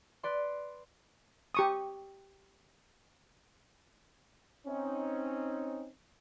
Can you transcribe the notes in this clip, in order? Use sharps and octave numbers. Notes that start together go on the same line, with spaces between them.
B4 D5 C6
G4 C#6 D#6
C4 C#4 D#4